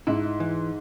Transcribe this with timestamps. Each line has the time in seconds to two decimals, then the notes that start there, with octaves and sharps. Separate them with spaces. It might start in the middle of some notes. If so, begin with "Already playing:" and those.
0.07 G#2 E4
0.40 E3